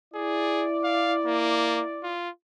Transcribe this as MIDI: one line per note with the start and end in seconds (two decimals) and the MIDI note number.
0.15 2.17 64
0.15 0.65 68
0.15 2.17 74
0.84 1.13 77
1.26 1.82 58
2.03 2.29 65